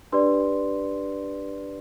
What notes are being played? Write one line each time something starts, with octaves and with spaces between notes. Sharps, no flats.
D4 G4 B4 D5 C6